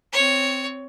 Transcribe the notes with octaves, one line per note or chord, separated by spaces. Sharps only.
C4 C#5